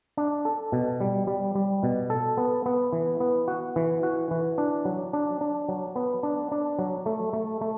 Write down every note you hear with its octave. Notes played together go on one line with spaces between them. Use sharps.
D4
A4
B2
G3
G3
G3
B2
A4
B3
B3
E3
B3
F#4
E3
F#4
E3
D4
F#3
D4
D4
F#3
B3
D4
D4
F#3
A3
A3
A3